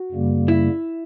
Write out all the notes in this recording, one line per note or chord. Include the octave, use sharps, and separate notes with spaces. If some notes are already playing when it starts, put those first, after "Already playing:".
Already playing: F#4
F#2 C#3 G3 A#3
E4